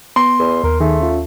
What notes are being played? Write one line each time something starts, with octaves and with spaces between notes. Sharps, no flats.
B3 C6 D#7
E2
D#2 A#4
D#3 A3 G#4
C#4 F4